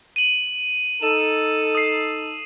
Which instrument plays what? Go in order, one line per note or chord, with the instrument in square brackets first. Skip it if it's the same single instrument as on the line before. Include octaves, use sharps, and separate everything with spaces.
[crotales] D#7 F#7
[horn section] D#4 A4 [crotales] D#7 E7
[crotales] D#6 C7